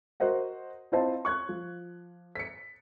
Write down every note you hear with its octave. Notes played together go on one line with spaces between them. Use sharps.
F#4 A#4 C5 D#5 F#5
C4 E4 F4 C5 D#5 A5
C#6 F#6 G#6
F3
B6 C#7